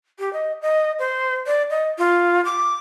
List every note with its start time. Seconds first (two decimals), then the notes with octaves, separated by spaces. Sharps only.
0.19 G4
0.33 D#5
0.62 D#5
0.99 C5
1.46 D5
1.70 D#5
1.98 F4
2.45 D6